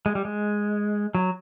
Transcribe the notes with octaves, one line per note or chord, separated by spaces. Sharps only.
G#3
G3
G#3
F#3